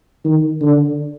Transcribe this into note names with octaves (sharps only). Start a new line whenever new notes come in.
D#3
D3